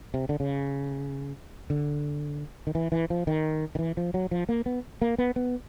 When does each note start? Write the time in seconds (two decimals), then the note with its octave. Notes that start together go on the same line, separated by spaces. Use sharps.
0.14 C3
0.29 D3
0.40 C#3
1.70 D3
2.67 D#3
2.75 E3
2.92 E3
3.10 F3
3.27 D#3
3.75 D#3
3.79 E3
3.97 F3
4.14 F#3
4.31 F3
4.49 A#3
4.66 B3
5.02 A#3
5.18 B3
5.36 B3